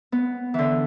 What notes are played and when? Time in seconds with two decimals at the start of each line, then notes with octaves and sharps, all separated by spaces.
0.12 B3
0.54 D3 E3